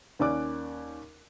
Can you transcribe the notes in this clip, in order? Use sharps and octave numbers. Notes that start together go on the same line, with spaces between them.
D#2 C#4 D5 D6 F#6